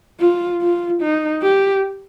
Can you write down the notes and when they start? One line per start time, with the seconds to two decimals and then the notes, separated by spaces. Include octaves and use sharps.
0.20 F4
0.62 F4
1.02 D#4
1.43 G4